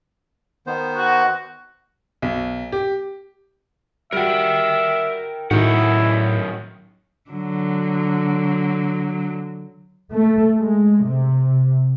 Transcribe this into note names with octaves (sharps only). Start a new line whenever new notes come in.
D#3 B3 C5
F#4
B1
G4
G3 F#4 A#4 E5 G5
F#2 A2 D#3 D#4 E4 F#4 F#5
D3 F#3
A3
G#3
C3